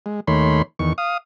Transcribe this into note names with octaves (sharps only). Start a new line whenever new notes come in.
G#3
D#2 D#3 A3 C#5 B5 C6
E2 D#3 C#6
F5 D#6